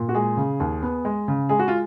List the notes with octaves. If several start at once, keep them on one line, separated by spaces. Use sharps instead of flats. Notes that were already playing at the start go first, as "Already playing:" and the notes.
Already playing: A#2
F#4
G#3 G#4
C#3
D#2
B3
G#3
C#3
G#3 G#4
F#4
F4